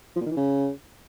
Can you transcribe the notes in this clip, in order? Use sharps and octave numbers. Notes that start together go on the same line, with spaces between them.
F3
A#2
D#3
E3
C#3